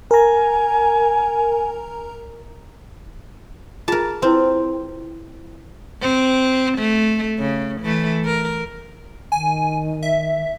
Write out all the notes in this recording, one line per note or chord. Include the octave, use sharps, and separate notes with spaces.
A#4 G#5 A#5
F4 G#4 A#4 A5
C4 E4 B4 G5
C4
A3
C#3
E3 A3
A#4
D#3 G#5
E5